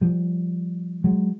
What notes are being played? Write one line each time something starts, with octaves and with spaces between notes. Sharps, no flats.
F3 G3
F#3 G#3